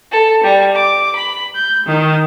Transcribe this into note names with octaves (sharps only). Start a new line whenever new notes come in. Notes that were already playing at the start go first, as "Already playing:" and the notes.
A4
G3
D6
B5
G6
D#3